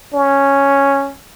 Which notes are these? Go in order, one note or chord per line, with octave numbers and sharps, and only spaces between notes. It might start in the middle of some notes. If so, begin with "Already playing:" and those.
C#4